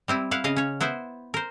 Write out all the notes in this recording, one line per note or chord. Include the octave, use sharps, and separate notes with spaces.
G3 C4 E4
E4 F5 F#5
C#3 D#5 F5
C#4 C#5
B3 E4 C5 E5
A#4 C5